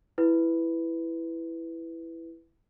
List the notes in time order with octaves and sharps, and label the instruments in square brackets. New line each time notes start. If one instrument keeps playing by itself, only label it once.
[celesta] E4 B4